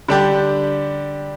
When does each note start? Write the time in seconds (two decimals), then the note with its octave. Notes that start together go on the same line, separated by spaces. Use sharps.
0.08 D3 G3 D4 G4